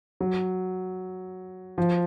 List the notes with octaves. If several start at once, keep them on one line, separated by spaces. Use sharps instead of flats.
F#3
F3